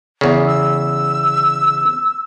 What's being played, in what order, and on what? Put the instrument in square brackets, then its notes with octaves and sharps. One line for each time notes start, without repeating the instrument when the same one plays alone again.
[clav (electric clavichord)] E2 C#3
[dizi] E6